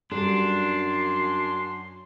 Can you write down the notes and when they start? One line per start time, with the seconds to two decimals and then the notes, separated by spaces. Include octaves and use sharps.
0.11 F#2 G3 D4 A4 C6